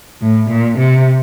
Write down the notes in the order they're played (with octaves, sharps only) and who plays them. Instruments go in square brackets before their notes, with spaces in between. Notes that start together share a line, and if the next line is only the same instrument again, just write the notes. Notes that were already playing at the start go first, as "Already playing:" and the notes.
[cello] A2
A#2
C3